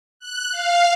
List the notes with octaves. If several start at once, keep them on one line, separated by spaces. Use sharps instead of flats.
F#6
F5